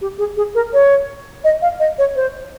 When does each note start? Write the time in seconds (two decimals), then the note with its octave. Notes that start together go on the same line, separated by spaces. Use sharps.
0.01 G4
0.18 G#4
0.37 G#4
0.55 A#4
0.73 C#5
1.44 D#5
1.62 F5
1.80 D#5
1.98 C#5
2.16 C5